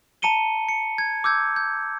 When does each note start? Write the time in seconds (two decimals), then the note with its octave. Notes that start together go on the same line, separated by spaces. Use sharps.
0.22 A5 A#5 C#7 D#7 G7
0.69 C#7
0.98 G#6
1.24 D6 E6 G6 G#6
1.56 G6